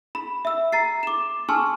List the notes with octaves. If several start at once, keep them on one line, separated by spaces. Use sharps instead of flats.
B5
E5 E6
A#5 A6 C7
D6 E7
G#5 A5 C6 C#6 E6 F6